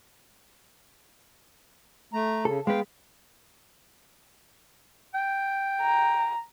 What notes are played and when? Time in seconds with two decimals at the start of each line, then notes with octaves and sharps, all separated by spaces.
2.13 A3 A#5
2.45 C#3 A4
2.67 G#3 B3 F5 G5
5.14 G5
5.82 A#5